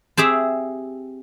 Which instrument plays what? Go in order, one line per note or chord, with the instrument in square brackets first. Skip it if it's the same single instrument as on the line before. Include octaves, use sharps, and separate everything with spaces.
[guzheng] C4 G4 G#4 E5